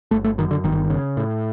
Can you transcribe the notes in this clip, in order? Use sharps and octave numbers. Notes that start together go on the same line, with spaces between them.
G1 A3
A3
F#2 D#3
D3
G1 D#3
C#3
A2